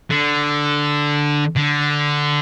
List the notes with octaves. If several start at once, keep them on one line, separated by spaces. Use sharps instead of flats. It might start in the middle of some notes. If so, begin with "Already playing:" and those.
D3
D3